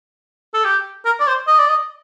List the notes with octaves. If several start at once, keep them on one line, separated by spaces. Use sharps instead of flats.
A4
G4
A#4
D5
C5
D#5
D5
D#5